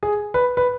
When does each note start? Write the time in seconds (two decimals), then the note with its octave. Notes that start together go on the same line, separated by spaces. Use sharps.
0.03 G#4
0.34 B4
0.57 B4